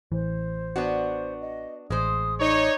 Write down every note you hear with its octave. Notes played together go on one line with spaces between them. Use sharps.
A1 E3 C5
B3 D4 F#4
D#5
A1 G#3 C5 D#6
D#4 C#5 D5